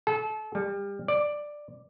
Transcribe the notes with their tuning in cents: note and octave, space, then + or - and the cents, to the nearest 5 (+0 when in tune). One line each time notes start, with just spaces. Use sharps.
A4 -30
G3 +30
D5 +10